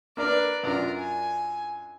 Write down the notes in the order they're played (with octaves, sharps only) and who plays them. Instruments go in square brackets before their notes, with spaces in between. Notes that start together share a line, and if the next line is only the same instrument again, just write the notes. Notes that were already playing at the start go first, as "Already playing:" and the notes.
[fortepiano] A#3 D4 A#4 [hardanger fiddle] B4 D5
[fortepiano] F#2 D4 F4 [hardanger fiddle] A#4
[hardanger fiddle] G#5